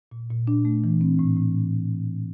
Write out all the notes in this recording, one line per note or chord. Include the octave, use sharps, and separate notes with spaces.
A#2
A#2
D4
A3
E3
C4
A2
A2